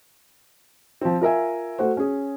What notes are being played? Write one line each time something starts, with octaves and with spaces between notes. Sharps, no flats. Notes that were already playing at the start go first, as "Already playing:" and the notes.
F3 C4
F4 A#4 E5 G#5
A3 F#4 C5
C#4 G#4